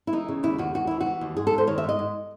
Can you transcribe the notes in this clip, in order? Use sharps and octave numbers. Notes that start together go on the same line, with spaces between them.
E4
E3 D#4
C#3
D#2 E4
D#2 F#4
D#2 F#4
E3 E4
F#4
E3
D#2
G#2 G#4
A4
G#2 C5
D#3 C#5
E5
G#2 D#5
G#2